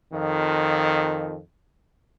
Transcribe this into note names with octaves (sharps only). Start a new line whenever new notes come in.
F2 D#3